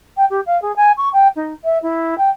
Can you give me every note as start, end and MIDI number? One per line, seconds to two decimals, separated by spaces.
0.17 0.25 79
0.30 0.40 67
0.46 0.60 77
0.62 0.75 68
0.76 0.92 80
0.97 1.09 85
1.13 1.28 79
1.36 1.53 63
1.64 1.78 76
1.82 2.17 64
2.18 2.30 79